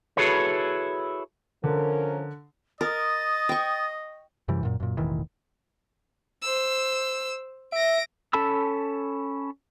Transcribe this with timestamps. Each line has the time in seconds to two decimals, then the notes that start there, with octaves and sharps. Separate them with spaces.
0.17 E4 F#4 G#4 A4 B4 C#5
1.64 D3 F3 C#4 A#4
2.81 A#4 D#5 D#6 A6
3.49 G5 C#6
4.48 F#2 C3 E3 G3
4.63 F#2 A#2
4.80 F#2 A#2
4.97 E1 A1 D#3 E3
6.42 C5 E6
7.72 E5 A#6 D7
8.33 C#4 A4 A5 B5 E6